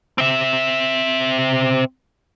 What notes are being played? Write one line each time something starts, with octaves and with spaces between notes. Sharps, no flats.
C4 E5